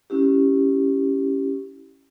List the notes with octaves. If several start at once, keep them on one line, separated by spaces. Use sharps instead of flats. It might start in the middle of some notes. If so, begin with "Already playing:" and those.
C#4 E4 G4